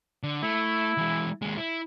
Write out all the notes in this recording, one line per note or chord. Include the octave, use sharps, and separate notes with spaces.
D3
A3 E4
E3 G#3
D#2 G#3
E4